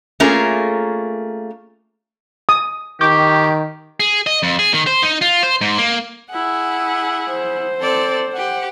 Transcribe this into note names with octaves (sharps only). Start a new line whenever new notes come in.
A3 A#3 C#4 F4 G#4 A#4
D#6
D#3 G4 C#6 D6 G6
G#4
D#5
F2
G#4
D#3
C5
D#4
F4
C5
G#2
A#3
E4 G#4 F#5
C5
C4 A4 D5
G4 F#5